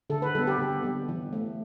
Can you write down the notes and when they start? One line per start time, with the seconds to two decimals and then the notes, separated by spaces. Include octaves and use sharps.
0.10 D3 A4
0.22 B4
0.35 G3 B3 A4
0.47 G4
0.58 D3
0.83 G3 B3
1.09 E3
1.33 A3